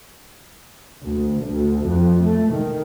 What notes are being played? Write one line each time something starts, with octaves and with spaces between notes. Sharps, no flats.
D2
D2
F2
A3
D#3